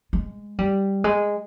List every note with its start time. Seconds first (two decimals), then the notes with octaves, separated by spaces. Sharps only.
0.13 G#3
0.59 G3
1.04 G#3